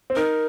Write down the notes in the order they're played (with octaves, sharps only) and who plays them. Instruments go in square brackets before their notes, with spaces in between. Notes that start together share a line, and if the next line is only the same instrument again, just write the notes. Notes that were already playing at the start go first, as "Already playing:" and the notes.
[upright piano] C4
[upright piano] D#4 [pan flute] A#4